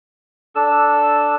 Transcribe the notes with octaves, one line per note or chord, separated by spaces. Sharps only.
D4 A4 E6